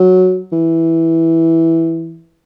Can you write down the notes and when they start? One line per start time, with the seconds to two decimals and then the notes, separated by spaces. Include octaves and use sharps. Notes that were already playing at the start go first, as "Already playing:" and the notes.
Already playing: F#3
0.53 E3